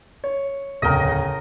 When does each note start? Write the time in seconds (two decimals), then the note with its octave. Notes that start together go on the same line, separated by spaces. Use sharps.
0.24 C#5
0.82 D1 E2 C#3 A#4 D#5 G5